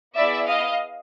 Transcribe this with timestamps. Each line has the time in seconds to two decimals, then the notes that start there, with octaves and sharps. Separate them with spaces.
0.16 B3 E4 G#4 D5 E5
0.48 D#5 F5